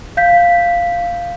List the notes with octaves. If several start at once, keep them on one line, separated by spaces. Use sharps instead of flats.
F5 G6 B6